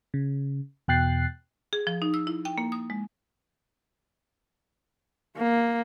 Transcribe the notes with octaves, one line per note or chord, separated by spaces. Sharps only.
C#3
E2 B2 G5 F#6 A6 C7
G#4
F3
D#4
E6
E4
G5
A#3
D#6
G#3
A#3